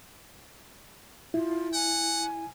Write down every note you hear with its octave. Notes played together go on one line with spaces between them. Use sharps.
E4 F4
F#5 G#5